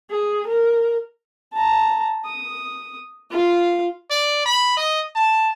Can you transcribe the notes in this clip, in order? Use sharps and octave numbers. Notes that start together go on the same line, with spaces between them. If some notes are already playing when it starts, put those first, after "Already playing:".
G#4
A#4
A5 A#5
D#6
F4 F5
D5
B5
D#5
A5